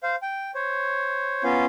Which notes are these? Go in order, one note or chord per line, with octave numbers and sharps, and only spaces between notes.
C5 F5
G5
C5 C#5
B3 C#4 F4 F5